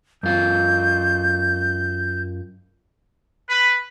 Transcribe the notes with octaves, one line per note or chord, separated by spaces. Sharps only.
F#2 F4 G6
B4